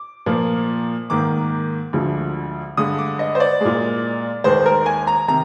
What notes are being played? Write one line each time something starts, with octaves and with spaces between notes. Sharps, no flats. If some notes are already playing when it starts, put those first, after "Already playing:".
Already playing: D6
A#2 F3 A#3
G#2 D#3 A#3 D6
D2 D3 F3 G#3
G2 D3 G#3 D#6
D6
D#5
C5
D5
A#2 G#3
D#2 D#3 G#3 C5
A#4
G#5
A#5
C3 D#3 A#5